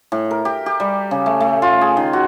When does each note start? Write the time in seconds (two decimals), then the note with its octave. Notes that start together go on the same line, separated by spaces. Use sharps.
0.12 A2
0.31 A#4
0.45 G4
0.66 G4
0.80 G3
1.11 C#3
1.26 A3
1.40 A3
1.62 F4
1.81 G#4
1.97 D#3
2.13 F#4